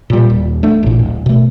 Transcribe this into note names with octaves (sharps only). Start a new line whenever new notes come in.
A#2 G3
D#1
A3 D4
A1 A#2
D1
B2 A3